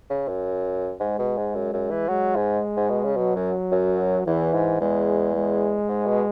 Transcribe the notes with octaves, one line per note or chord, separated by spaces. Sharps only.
C#3
F#2
G#2 G#3
B2
G#2
F#2
F#2
E3
F#3 G#3
G#2
G#2
B2
C#3
B2 F#3
F#2
F#2
E2 E3
G#2
E2 G#3
G#3
G#2
B2